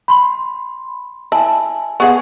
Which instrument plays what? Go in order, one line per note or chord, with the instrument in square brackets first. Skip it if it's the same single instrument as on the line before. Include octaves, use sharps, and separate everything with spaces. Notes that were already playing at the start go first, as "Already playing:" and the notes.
[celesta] B5 C6
[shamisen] E4 [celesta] G#5 A5
[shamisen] B3 G#4 F#5 [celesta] C#6